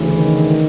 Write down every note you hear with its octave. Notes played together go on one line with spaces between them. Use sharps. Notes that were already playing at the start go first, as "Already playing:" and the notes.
Already playing: D2 C#3 E3
D#3